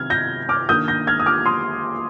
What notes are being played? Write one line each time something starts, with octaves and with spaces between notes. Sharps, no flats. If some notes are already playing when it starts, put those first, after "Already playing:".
Already playing: C3 D#3 G3 F6 G#6
G6 A#6
D6 F6
D#3 A#3 D4 D#6 G6
G6 A#6
F6 G#6
D#6
D6 F6
C6 D#6